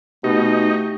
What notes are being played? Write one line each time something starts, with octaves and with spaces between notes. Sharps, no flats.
B2 A3 D#4 G4